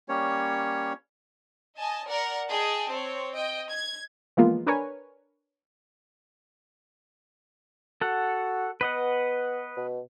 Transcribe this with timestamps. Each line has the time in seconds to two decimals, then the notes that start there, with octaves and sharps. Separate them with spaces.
0.09 G3 A#3 C#4 C#5
1.77 D#5 G#5 A5
2.08 A#4 D5 F#5
2.49 G#4 D#5 G5 A5
2.90 C4 C#5
3.35 D#5 G5
3.71 G#6
4.37 E3 F3 G#3 A#3 B3 F4
4.67 D4 A#4 B4 C#5 G#5
8.01 F#4 A4 F#5
8.81 B3 B4 D#5 F#5
9.77 B2